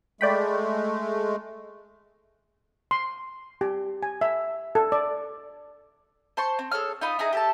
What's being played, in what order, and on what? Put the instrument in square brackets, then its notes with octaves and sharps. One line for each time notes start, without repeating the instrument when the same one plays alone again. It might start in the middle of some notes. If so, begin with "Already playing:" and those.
[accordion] G#3 A3 [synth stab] D5 G5 B5
[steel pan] C6
G4
G#5
E5
A4
D5
[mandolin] C5 A5 C6 C#6
C4
G#4 A4 C#5 F6
D#4 F4 D#5 B5
D#4 E4 G#4 A#5
G4 A4 A5